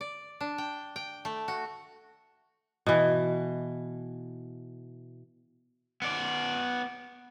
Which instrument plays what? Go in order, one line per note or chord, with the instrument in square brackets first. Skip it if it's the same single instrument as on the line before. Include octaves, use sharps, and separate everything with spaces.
[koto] D5
D4
G5
G5
A3
F#4
[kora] B2 E3
[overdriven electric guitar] B3 D5